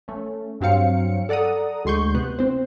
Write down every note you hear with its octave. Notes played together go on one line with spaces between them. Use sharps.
A3 C#4
G2 F#3 C4 F5 C#7
A4 D5 F#5 A#5 D#6
D2 G#3 C6 C#6 G6
C3 B3 F#6
C4 C5